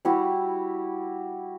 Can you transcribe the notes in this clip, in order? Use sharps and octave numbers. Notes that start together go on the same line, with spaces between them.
G3 E4 F#4 G4